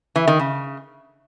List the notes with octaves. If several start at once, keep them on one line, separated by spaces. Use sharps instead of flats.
E3
D#3
C#3